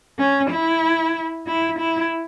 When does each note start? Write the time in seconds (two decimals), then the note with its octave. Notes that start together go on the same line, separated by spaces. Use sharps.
0.19 C#4
0.51 E4
1.47 E4
1.79 E4